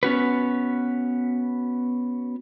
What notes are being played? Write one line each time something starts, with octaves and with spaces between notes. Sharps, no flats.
B3 C#4 F#4 B4